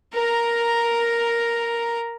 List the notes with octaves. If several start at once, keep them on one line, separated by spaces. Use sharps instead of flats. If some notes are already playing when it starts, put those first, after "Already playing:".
A#4 A#5